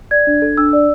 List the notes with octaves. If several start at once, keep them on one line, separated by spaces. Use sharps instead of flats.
D5 G#6
D4
A4
D4 E6
D5